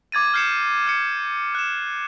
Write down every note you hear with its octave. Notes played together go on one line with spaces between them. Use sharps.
D6 G#6 A6 D#7
F6 G6 C7 C#7 E7
F6 C#7
F#6 E7